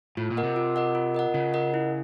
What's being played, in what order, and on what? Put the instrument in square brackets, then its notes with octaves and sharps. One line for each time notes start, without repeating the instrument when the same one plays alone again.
[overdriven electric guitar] A2 [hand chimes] F4
[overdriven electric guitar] A#2
[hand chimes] A#4 D#5 F#5
[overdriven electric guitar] C3
[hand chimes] F4
A#4 D#5 F#5
F4
A#4 D#5 F#5
[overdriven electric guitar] C#3 [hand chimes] F4
[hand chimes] A#4 D#5 F#5
E4